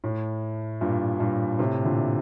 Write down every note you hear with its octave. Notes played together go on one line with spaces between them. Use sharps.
A2
G2 A#2
G2 A#2
A2 C3
A#2 D3